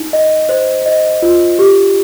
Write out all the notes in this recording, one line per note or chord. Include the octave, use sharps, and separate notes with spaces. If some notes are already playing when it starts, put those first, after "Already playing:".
Already playing: D#4
D#5
C5
D#5
F4
G4